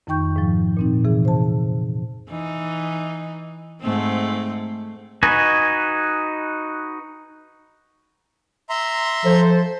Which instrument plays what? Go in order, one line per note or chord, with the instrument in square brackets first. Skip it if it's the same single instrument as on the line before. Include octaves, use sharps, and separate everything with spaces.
[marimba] F2 D#3 D#4 G5 C#6 G6
G#2 F3
A#2 C4 D#4
C3 E3 G#4
C5 A5
[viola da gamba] E3 D#4
G#2 A3 C4
[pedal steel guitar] D#4 F#4 B4 D#5 G#5
[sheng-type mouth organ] E5 A#5 C6
[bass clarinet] F3 [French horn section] A4 C5